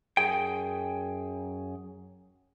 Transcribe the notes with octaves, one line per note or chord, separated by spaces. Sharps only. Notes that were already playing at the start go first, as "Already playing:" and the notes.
F#2 G#4 G5